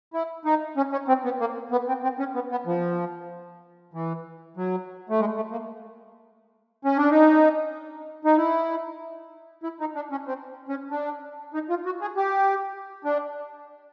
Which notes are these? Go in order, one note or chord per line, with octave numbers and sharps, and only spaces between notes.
E4
D#4
C#4
C#4
C4
B3
A#3
B3
C4
C4
C#4
B3
B3
F3
E3
F#3
A3
G#3
A3
A#3
C#4
D4
D#4
D#4
E4
E4
D#4
D4
C#4
C4
C#4
D4
D#4
F4
F#4
G#4
G4
D4